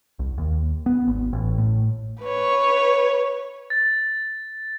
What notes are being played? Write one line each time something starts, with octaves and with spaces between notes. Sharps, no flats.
C2
D#2
B3
G#1
A1
A2
B4 C#5
A6